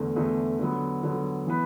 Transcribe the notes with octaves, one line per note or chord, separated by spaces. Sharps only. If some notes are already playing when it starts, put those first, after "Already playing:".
Already playing: E2 D3 A3
E2 D3 A3
D3 F#3 B3
D3 F#3 B3
E3 B3 E4 B4